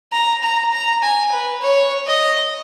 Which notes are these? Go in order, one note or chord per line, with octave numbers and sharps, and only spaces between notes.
A#5
A#5
A#5
G#5
B4
C#5
D#5